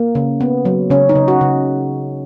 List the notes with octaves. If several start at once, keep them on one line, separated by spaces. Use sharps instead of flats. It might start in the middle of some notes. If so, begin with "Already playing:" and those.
Already playing: A#3
C#3
B3
F#3
C#3 C#4
D#4
C#3
F#4
C#3